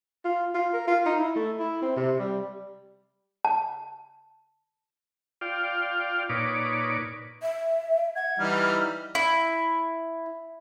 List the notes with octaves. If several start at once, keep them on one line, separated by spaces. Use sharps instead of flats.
F4
F4
A#4
F4
D#4
E4
A3
E4
C4
C3
G3
A5
F4 D5 F5 G5
A#2 D#4 B4 C#5 D5 D6
E5
F#5 G#6
E3 G3 D#4 F6
E4